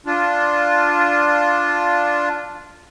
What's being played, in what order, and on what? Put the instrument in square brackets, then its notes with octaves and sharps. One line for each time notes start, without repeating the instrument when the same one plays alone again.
[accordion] D4 F4